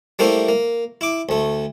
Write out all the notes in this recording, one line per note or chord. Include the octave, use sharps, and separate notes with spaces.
G3 A3 A#3 E4 C5
A#3
E4 D6
D2 A3